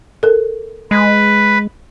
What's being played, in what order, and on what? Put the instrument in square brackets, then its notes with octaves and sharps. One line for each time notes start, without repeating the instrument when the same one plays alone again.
[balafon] A4 A#4
[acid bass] G#3 [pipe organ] B4